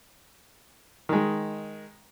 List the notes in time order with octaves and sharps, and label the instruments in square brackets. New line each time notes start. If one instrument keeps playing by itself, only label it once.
[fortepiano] D#3 G#3